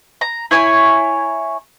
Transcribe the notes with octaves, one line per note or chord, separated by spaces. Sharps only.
A#5
E4 C#5 G#5